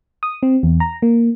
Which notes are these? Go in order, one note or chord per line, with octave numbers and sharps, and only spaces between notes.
D#6
C4
E2
A#5
A#3